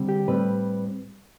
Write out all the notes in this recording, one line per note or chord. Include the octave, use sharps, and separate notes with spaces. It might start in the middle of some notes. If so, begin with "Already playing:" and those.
Already playing: D3 G3 C4
G4
A2 G3 C4 B4